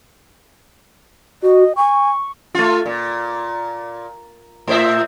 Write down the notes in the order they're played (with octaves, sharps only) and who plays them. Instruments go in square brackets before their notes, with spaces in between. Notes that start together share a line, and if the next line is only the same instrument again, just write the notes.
[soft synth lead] F#4 [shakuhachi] D#5
[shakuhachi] G#5 [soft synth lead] C#6
[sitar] A3 F4
A#2
A2 C5 E5